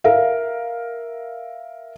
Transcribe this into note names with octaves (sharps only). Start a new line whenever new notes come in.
A#4 E5 F5